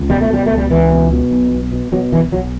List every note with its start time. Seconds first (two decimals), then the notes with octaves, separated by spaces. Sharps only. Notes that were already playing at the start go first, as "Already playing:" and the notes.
Already playing: C#2
0.09 B2 G3
0.21 A3
0.30 B2 G3
0.46 C#2 A3
0.58 G3
0.70 C#2 E3
0.91 B2
1.11 B2
1.31 B1
1.51 B1
1.72 B2
1.92 B2 F#3
2.12 B1 E3
2.32 B1 F#3